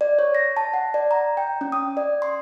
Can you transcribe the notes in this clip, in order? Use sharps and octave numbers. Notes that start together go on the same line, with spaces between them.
D5
C#5
A#6
A5
F#5
D5
A#5
G5
C#4
D#6
D5
C6